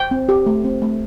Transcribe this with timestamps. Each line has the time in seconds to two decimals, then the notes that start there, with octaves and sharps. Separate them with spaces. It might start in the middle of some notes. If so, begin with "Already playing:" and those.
Already playing: G5
0.11 C4
0.29 G4
0.46 A3
0.64 C4
0.82 A3